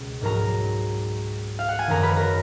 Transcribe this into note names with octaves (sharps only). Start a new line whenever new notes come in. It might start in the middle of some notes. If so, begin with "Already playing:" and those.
Already playing: C#2 B2
G#2 F#3 A#4 A#5
F5
F#5
G#5
F#2 D#3 F#3 A#4 A#5
B4 B5
A#4 A#5